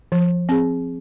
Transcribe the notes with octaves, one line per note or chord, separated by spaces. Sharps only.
F3
C4 G#4